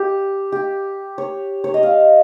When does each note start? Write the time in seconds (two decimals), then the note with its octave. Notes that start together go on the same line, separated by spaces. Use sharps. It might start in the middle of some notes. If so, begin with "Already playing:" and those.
Already playing: G4
0.52 G4
1.18 C#5
1.64 C#5
1.74 D#5
1.83 F5